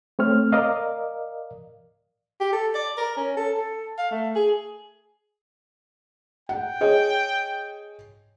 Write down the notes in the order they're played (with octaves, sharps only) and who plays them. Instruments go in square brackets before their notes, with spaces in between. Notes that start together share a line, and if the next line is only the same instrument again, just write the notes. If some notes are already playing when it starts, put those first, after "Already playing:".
[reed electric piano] A3 C4 C#5 F6
A#4 D5 D#5 F5
[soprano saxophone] G4
A4
D5
A#4
C#4
A4
A4
F5
A3
G#4
[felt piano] F#5 [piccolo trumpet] G5
[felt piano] G#4 C#5 D#5